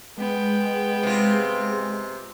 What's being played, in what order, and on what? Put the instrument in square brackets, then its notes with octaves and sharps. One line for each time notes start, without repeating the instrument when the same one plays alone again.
[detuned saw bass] G#3 [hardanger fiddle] B3 G5
[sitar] C3 F4